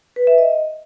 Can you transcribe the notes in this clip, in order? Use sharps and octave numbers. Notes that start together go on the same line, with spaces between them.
B4
E5
D#5